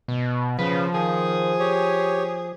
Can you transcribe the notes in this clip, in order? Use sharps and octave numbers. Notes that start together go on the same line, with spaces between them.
B2
C#3 F3 B4
D#3 G#4
G4 C#5